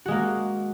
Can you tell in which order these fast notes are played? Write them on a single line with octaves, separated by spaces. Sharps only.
F#4 G#3 A#3